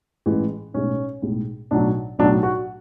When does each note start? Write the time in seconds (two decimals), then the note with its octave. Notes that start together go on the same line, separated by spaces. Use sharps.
0.26 A1 A2 E3 G#3
0.74 B1 A2 G#3 C#4
1.22 B1 A2 G#3
1.71 B1 A2 F#3 D4
2.19 B1 A2 F#3 D4
2.43 F#4